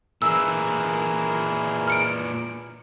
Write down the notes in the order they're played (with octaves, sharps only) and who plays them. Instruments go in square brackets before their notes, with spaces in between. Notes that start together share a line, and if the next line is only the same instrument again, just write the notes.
[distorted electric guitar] A#2 E3 [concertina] E4 G#4 A#4 [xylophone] E6
[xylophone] F6 C#7 D7